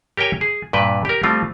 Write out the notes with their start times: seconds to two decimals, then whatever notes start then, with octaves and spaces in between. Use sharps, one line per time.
0.17 G4 A#4 C#5 G5 G#5
0.41 G#4
0.73 G2 A#2 B4 G5
1.05 G4 A#4
1.23 F3 G3 A3 C4 F4